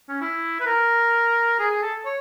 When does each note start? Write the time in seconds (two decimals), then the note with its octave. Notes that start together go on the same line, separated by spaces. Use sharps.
0.09 C#4
0.21 E4
0.61 B4
0.66 A#4
1.59 G#4
1.71 G#4
1.82 A4
2.06 C#5